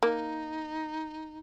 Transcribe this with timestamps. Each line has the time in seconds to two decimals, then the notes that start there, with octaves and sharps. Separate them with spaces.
0.03 A#3 D#4